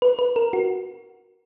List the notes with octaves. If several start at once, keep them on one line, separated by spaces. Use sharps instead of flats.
B4
B4
A#4
F#4